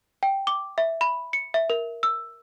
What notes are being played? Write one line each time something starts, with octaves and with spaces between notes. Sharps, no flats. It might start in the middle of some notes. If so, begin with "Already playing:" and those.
G5
D6
E5
B5
C#7
E5
A#4
E6